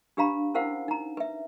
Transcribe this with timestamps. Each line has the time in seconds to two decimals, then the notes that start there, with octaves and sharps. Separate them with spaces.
0.17 D4 G4 B4 F5 A#5 B5
0.54 C#4 E4 A#4 C5 F5 F#5
0.88 D#4 A#5
1.17 B4 E5